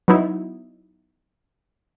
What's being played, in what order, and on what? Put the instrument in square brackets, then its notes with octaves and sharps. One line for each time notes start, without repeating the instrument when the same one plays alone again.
[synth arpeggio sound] F#3 B3 D#4 E4